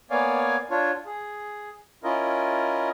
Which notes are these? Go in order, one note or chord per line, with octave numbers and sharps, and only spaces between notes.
A#3 B3 C#5 D5 F5 G#5
D4 F4 C#5
G#4
C#4 E4 F4 A#4 D#5